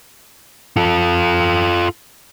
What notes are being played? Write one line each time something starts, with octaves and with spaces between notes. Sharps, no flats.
F4 A4